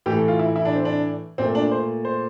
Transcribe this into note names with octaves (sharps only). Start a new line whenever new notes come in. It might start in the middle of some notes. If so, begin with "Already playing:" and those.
A2 E3 A3 G4
A4
F4
E4
E4
D4
C4
D4
A#2 A3 C4
D4
C5
C5